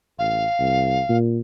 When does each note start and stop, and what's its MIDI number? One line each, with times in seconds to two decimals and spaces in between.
0.19 0.45 33
0.19 1.17 77
0.59 1.01 36
1.09 1.41 46